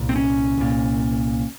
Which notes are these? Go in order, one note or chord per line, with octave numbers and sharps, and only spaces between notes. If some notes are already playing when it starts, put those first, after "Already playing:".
Already playing: C2 A#2
C4
C#4
C2 A#2